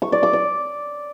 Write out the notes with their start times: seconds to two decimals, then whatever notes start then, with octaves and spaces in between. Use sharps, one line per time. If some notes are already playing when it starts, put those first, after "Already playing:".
0.02 C#6
0.12 D5
0.23 D6
0.33 D5